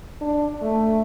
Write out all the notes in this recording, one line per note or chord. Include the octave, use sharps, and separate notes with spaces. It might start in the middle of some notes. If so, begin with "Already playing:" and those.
D4
A3